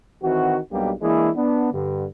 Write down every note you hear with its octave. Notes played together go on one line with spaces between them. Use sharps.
D#3 E3 C4 F#4
B1 B2 G3 A#3 D4 G4
E3 G#3 A#3 D4 E4 G#4
B3 D4
G2 D3